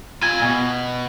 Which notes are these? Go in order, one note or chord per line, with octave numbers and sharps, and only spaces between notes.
F4 G#5 G#6
B2